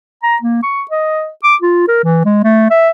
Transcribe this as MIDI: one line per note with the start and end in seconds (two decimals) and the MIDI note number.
0.23 0.37 82
0.42 0.62 58
0.63 0.83 85
0.91 1.28 75
1.44 1.55 86
1.62 1.85 65
1.88 2.00 70
2.04 2.21 52
2.25 2.40 56
2.44 2.68 57
2.70 2.90 76